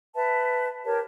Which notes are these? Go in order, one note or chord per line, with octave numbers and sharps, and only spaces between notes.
B4 E5 A5
G4 A#4 C#5 A5